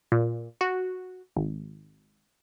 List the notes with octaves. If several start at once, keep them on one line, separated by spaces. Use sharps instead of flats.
A#2
F#4
G#1